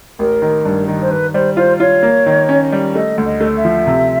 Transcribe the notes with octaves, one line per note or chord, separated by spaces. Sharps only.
A1 A#4
D#3
G2
D#3
C5
D#3 B4
G3 C5
F4 C5
F4 C#5
A#3
D#3
C#4
G3
A3 D#5
D2
D#5
A3
E5
F3
C3